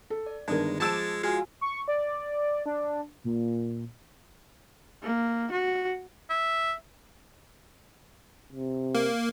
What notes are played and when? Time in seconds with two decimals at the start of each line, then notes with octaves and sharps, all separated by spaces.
0.10 A4
0.26 D5
0.48 G1 D#3 G#3 D4 A#4 D#6 G#6
0.80 F3 G#3 A5 D6 E6 A6 E7
1.23 G#3 F4 F#4 F5 G#5
1.61 C#6
1.88 D5
2.66 D4
3.24 A#2
5.03 A#3
5.51 F#4
6.30 E5
8.53 C3
8.95 A#3